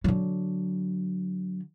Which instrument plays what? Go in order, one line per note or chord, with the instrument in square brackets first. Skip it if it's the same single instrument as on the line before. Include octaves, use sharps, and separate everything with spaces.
[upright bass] D3 F#3